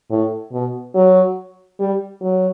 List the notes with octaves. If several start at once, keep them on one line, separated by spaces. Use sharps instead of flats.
A2
B2
F#3
G3
F#3